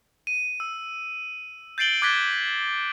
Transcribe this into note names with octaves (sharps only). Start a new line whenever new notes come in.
D#7
E6
G6 A6 C7 D7 F#7 G7
D6 F#6 G#6 A6 B6 G7